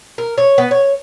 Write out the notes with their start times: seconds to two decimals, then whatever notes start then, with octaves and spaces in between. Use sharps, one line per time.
0.18 A#4
0.38 C#5
0.58 B3
0.71 C#5